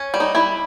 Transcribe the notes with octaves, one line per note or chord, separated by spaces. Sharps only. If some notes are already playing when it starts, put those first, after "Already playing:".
Already playing: C#4
G3
D#4
G3 E4